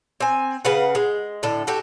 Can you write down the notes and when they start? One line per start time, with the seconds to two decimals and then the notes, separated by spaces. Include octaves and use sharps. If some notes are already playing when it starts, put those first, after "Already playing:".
0.20 C4 G#5
0.65 C#3 B4 F#5
0.95 G#3
1.43 A2 D3 A4
1.67 F#4 G4 A4